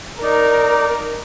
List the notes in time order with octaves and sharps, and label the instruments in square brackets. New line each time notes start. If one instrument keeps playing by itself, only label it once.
[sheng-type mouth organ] D#4 D5 [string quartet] A#4